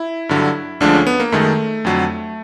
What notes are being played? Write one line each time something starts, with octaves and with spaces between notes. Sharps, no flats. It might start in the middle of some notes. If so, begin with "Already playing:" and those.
Already playing: E4
G2 D3 F#3
D2 D3 F3 G#3 D4
C#4
B3
A#3
F#2 D#3 G#3 A3
F2 D3 F#3